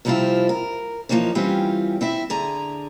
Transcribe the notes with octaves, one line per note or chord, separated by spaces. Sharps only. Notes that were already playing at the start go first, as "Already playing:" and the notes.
C3 F3 G3 C4 E4 F4
A#4
E3 F3 G#3 A#3 D#4 C#5
E3 G3 C4 C#4 F4 G4
C4 E4 E5
D3 G#4 A#5